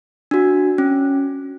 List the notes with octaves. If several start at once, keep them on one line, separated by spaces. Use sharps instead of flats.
D4 F#4
C#4